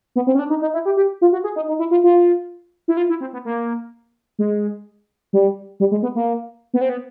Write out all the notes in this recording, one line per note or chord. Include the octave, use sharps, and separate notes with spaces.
B3
C4
C#4
D4
D#4
D#4
E4
G4
G4
F4
F#4
G#4
D#4
D#4
E4
F4
F4
E4
F4
E4
C4
B3
A#3
G#3
G3
G3
G#3
B3
A#3
B3
C4
B3